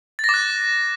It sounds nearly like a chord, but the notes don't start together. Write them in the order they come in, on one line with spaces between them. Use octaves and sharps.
A6 A#6 D6 F#6